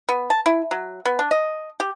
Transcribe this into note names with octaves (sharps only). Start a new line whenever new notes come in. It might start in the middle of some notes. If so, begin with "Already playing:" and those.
B3
A5
E4
F#3
B3
D4
D#5
G4